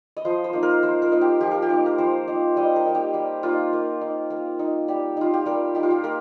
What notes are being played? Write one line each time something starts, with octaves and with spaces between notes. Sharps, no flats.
D#5
F3 C5
C5
A#3 D#4
A#4
F3 C5
A#4
A#3 D#4
G4
F3 G4
A#4
G4
A#3 D#4
A#4
F3 C5
A#3 D#4
G3 D#5
A#4
A#3 D#4
G4
G3
A#3 D#4 F4
A#3
D#4
A#3
D#4
G3 G4
D#4 F4
G4
G3 A#4
D#4 G4
F4
G4
A#3 A#4